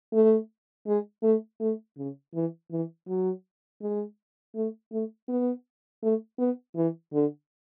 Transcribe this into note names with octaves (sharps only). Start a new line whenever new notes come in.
A3
G#3
A3
A3
C#3
E3
E3
F#3
G#3
A3
A3
B3
A3
B3
E3
D3